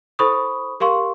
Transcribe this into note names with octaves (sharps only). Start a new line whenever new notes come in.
E4 A4 C5 B5 C#6 D#6
G4 A#4 F5 C6 C#6